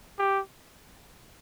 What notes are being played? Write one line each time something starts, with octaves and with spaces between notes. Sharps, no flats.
G4